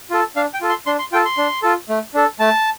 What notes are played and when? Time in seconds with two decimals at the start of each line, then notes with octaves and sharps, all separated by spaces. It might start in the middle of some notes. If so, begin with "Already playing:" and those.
0.10 F4 A4
0.36 D4 F5
0.54 G5
0.61 F4 A4
0.69 C6
0.86 D4 C6
0.99 C6
1.12 F4 A4 G5
1.25 C6
1.37 D4
1.62 F4 A4
1.89 A3
2.14 D4 A4
2.39 A3 A5